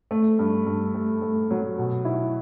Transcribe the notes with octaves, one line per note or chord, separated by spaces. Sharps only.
A3
G2
G2
A3
A3
F#3
B2
E4